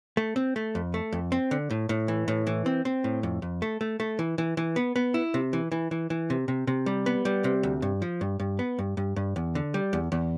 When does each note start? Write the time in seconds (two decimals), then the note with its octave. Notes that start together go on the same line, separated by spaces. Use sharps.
0.17 A3
0.36 C4
0.56 A3
0.75 F2
0.94 A3
1.13 F2
1.32 C4
1.51 D3
1.70 A2
1.89 A2
2.08 E3
2.28 A2
2.47 E3
2.66 C4
2.85 C4
3.04 A2
3.23 F2
3.42 F2
3.62 A3
3.81 A3
4.00 A3
4.19 E3
4.38 E3
4.57 E3
4.76 B3
4.96 B3
5.14 E4
5.34 C3
5.53 E3
5.72 E3
5.91 E3
6.10 E3
6.30 C3
6.48 C3
6.67 C3
6.86 G3
7.06 B3
7.25 G3
7.44 C3
7.63 D2
7.82 G2
8.02 F3
8.21 G2
8.40 G2
8.59 B3
8.79 G2
8.97 G2
9.16 G2
9.36 E2
9.55 D3
9.74 G3
9.93 E2
10.12 E2